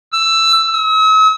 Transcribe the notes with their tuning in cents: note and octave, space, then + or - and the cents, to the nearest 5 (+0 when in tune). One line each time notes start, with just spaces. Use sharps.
E6 +10
E6 -45